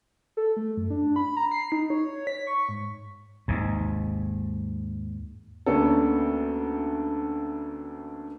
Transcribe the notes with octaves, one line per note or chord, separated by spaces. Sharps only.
A4
A3
F#2
D4
B5
A#5
C7
D#4
C#5
B6
C#6
G#2
D#2 G#2
D2 A#3 B3 C#4 D4 A4